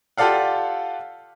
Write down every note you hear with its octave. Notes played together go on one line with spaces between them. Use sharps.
F4 G4 A4 D5 F5 F#5